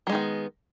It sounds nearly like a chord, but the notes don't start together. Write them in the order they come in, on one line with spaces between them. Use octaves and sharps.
F#3 G#3 D#3 B3